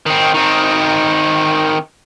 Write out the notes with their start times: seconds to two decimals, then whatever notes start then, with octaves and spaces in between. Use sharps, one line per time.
0.06 D#3 C4
0.34 D#3 C4